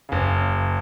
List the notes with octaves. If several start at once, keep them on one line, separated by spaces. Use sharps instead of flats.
F#1 C#3